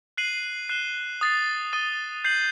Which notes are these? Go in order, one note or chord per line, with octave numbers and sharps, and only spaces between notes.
F#6 C7 D#7 F#7
F#6 C7 E7 G7
D#6 A6 C7
D#6 A6 D#7 G7
G6 C7 F#7